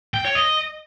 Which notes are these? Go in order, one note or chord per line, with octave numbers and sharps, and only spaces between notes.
G5
C#5
D#5